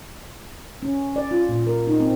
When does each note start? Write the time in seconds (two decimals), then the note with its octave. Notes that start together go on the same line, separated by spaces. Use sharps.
0.83 C#4
1.16 D5
1.31 F4
1.49 A#2
1.67 A#4
1.87 D#4
2.00 C4